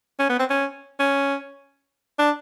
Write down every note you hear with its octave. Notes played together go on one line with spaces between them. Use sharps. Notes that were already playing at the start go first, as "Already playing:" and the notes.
C#4
B3
C4
C#4
C#4
D4